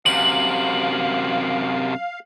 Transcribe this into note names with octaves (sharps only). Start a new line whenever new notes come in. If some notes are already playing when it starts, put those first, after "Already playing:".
F#2 C3 F5 F#7